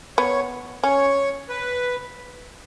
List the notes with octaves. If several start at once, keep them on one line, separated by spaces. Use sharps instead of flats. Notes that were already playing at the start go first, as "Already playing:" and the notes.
B3 C#5
C#4 C#5
B4